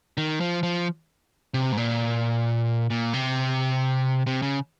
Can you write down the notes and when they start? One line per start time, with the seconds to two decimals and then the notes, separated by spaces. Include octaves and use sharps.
0.17 D#3
0.40 F3
0.63 F3
1.54 C3
1.72 G#2
1.77 A#2
2.90 A#2
3.13 C3
4.27 C3
4.42 C#3